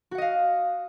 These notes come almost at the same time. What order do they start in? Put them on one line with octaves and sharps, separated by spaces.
F#4 F#5 D#5 F5